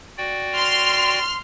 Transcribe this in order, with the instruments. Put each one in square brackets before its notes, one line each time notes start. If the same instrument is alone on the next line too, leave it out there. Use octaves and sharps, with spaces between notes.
[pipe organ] F#4 D5 G5
[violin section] C6 F6